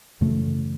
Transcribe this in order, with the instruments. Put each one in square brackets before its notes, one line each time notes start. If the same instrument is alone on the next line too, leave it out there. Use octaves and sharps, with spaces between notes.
[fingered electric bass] F#2 C#3 E3 A3